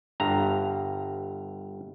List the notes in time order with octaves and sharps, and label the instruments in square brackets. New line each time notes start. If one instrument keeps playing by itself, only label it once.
[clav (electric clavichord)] G1 G2 A#5